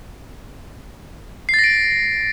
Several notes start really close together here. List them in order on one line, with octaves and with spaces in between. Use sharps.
C7 A6 A#6 D7